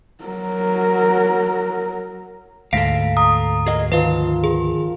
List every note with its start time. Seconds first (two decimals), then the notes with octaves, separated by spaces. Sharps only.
0.24 F#3 A#4
2.73 D2 G#2 A4 F5 A#6 B6 D7
3.17 A#5 D#6
3.67 F#4 G#4 A#4 D#5
3.92 D#3 F3 B4 F5
4.44 G#4